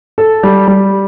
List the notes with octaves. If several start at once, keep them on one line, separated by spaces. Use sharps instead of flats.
A4
G3
G3